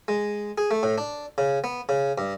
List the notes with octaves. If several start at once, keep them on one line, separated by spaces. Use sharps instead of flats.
G#3
G#4
A3
A2
D4
C#3
B3
C#3
G2